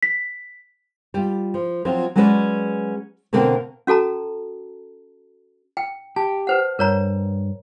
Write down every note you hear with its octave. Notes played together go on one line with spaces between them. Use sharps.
B6
G3 F4
F3
F3 F#3 C4 F4
F#3 G#3 C#4 F#4 B4 D5
B2 D3 A#3 C4 A#4
C#4 F#4 A4 A5 A#5
G5
G4 A5
B4 C5 F#5
G2 A#4 C#5 A#5